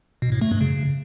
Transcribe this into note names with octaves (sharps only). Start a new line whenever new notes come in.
B2
A2
A3
G2
C#3